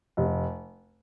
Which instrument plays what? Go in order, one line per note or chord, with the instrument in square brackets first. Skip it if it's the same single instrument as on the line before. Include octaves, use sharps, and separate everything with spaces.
[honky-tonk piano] F1